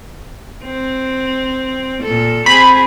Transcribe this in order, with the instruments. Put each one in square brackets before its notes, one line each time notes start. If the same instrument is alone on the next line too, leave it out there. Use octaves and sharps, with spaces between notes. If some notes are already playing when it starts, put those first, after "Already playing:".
[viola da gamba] C4
A#2 A4
[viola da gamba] C4 G#4 [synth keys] B5